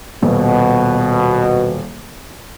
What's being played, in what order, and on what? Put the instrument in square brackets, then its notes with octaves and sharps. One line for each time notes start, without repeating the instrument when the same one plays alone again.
[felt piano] D#1 [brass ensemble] B2